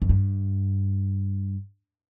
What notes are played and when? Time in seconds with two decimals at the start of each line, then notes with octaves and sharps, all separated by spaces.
0.02 F#2
0.09 G2